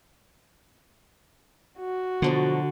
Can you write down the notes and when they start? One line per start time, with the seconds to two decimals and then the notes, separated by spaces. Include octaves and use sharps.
1.79 F#4
2.22 B2 D3 F3 F#3